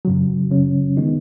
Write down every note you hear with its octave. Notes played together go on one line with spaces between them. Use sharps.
F#2 C#3 F#3
C#3 F#3 C#4
D#3 G#3 B3 D#4